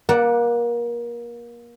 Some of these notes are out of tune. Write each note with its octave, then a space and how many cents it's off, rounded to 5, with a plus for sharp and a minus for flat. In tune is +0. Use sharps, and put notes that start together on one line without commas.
A#3 +30 D5 +0 F#5 +0